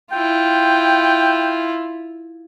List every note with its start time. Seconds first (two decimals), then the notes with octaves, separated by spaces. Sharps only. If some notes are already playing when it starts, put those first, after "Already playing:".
0.12 E4 F4 G5